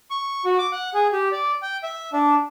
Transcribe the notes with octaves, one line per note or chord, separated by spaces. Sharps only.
C#6
F#4
D6
F#5
G#4
G4
D5
G5
E5
D4